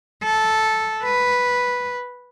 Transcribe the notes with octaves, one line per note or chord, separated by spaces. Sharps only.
A4
B4